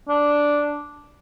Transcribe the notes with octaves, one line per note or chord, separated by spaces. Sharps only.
D4